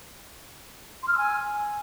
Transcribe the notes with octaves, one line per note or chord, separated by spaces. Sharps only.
C6
F6
E6
G#5